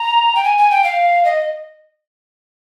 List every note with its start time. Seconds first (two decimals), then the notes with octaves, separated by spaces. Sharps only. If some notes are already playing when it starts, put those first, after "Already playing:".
Already playing: A#5
0.35 G5
0.45 G#5
0.58 G#5
0.71 G5
0.84 F5
1.25 D#5